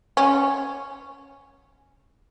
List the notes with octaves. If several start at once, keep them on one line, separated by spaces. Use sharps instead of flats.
C#4